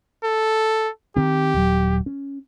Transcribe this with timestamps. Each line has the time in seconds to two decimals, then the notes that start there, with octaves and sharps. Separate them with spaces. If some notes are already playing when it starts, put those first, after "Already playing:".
0.24 A4
1.16 D#3 C4 G4
1.54 D#1 F#3
2.06 C#4